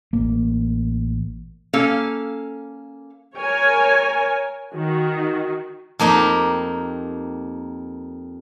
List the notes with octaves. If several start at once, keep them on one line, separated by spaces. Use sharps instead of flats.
A1 A#3
A#3 C#4 A4 F5
A#4 C#5 G#5
D#3 F#4
F2 A#3 D#4 G4